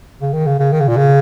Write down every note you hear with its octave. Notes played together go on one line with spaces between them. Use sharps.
C#3
D#3
C#3
C#3
D#3
C#3
A#2
C#3